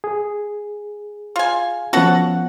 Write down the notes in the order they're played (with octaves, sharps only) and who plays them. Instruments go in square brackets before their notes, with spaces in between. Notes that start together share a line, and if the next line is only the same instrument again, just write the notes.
[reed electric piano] G#4
[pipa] F4 G#5
[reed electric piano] F3 B3 C#4 [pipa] F#4 A4 F#5